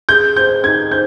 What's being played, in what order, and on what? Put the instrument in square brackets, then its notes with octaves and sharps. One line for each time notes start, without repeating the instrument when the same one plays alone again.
[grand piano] G#4 [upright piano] G6
[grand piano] C5 [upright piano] G6
[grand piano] D#4 [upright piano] G#6
[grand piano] C5 [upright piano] G6